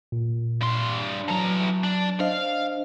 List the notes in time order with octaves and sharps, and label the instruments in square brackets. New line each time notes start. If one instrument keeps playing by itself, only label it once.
[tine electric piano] A#2
[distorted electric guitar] G2 C6
[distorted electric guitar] E3 A#5 [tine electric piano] F#3 A5
[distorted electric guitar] D4
[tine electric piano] D4 C5 D#5 [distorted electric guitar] F5